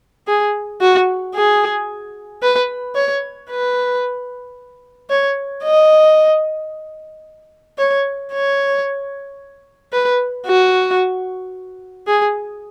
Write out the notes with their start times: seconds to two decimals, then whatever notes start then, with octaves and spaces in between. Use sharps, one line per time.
0.27 G#4
0.81 F#4
1.35 G#4
2.42 B4
2.95 C#5
3.50 B4
5.10 C#5
5.64 D#5
7.78 C#5
8.32 C#5
9.93 B4
10.47 F#4
12.07 G#4